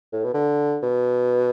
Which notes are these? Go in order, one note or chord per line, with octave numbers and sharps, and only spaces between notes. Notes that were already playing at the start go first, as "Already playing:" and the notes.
A2
B2
D3
B2